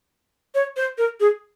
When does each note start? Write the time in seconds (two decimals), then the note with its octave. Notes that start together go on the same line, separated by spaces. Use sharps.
0.55 C#5
0.77 C5
0.98 A#4
1.20 G#4